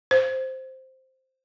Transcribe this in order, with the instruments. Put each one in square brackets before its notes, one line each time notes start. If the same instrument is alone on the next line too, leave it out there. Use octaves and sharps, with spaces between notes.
[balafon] C5